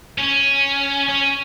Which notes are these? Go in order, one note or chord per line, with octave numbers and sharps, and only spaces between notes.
C#4
C#4